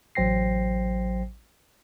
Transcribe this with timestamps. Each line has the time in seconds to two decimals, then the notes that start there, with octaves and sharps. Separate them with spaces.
0.15 A1 F#3 C5 G5 A#6 C7